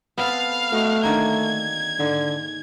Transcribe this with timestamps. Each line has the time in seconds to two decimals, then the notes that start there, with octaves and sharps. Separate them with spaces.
0.18 B3 C4 A4 F5
0.72 A3 F#4 D#5
1.03 D3 D#3 A#3 G#6
1.99 G#2 D3